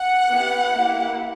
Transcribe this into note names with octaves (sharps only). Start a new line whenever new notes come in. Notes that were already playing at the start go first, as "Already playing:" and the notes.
Already playing: F#5
B3 E4 G4
A#3 E4 G4